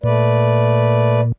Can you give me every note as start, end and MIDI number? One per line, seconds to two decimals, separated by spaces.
0.04 1.32 46
0.04 1.21 57
0.04 1.21 71
0.04 1.21 74